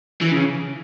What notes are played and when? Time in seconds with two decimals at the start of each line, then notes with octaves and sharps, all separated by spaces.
0.21 E3
0.32 C#3